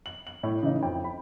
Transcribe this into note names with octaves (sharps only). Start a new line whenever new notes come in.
F#7
F#7
A2
C#3 E3 D#4
F2 G5
B5